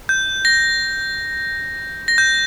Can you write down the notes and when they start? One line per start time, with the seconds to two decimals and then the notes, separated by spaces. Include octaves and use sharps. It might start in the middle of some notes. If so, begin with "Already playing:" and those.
0.09 G6
0.45 A#6
2.08 A#6
2.18 G6